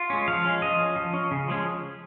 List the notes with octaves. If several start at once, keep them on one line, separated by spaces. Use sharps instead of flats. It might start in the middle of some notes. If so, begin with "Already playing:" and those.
Already playing: F4
G#3 C#4
F3 F5
G#3 C#4
F3 D#5
C#4
F3
C#4
C#3
F3 G#3 C#4